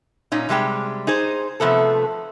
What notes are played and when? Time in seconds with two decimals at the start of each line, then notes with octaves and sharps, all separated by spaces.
0.32 A#2 C#4 D#4
0.49 C3 G3 G#3 G5
1.07 D#4 G#4 C5
1.60 C3 F3 A3 B3 A4